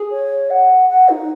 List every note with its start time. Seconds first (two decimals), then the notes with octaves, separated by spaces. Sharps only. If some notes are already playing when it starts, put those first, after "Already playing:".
Already playing: G#4
0.11 C#5
0.50 F#5
0.89 F#5
1.09 D#4